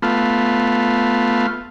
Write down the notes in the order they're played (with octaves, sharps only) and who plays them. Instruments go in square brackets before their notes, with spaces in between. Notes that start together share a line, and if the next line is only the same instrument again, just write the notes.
[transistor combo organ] A3 B3 F4